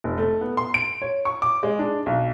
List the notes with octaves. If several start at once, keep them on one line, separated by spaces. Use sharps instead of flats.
F1
A3
B3
C6
D7
C#5
C#6
D6
G#3
D4
B1